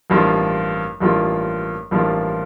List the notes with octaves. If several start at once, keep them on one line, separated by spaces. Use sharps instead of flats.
A1 G2 F3 A#3 F4
A1 G2 F3 A#3 F4
A1 G2 F3 A#3 F4